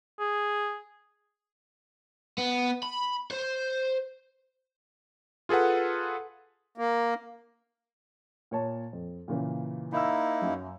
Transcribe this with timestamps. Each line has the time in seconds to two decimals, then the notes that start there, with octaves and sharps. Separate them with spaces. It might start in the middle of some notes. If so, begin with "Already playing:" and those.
0.20 G#4
2.38 B3
2.83 B5
3.31 C5
5.49 F4 G#4 A4 B4 F#5
6.78 A#3
8.51 A#2 C#5 A5
8.93 F2
9.28 A#2 C#3 E3
9.93 A#3 D#4 E4 B5 E6
10.42 F#2 F#3